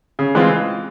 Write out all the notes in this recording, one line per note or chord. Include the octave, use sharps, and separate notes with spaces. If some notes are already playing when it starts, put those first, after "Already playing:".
C#3
E3 G#3 C4 F4